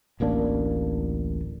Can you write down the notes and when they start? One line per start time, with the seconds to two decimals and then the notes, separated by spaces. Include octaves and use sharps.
0.20 D1 A1 A#3 D4